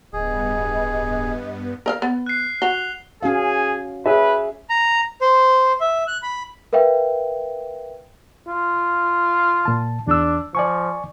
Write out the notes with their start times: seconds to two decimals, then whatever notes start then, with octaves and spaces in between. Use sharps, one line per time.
0.13 D1 G2 B3 G#4 D#5
1.86 A#4 D#5 F5
2.02 B3
2.26 F#6 C7
2.62 F#4 F7 G7
3.23 C#4 F#4 G#4 F5
4.06 G#4 B4 C#5 E5
4.70 A#5
5.21 C5
5.80 E5
6.07 F#6
6.23 B5
6.73 A#4 B4 E5 F5 G5
8.48 F4
9.65 A#2 A5
10.07 E2 D4 E6
10.55 F3 D5 G#5 C#6